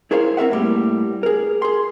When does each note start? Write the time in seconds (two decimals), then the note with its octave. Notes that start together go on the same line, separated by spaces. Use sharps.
0.11 E4 G#4 A#4 C5 C#5 F5
0.37 C4 A#4 E5 F#5
0.51 A2 G3 A#3
1.23 G#4 A#4
1.62 G#4 C6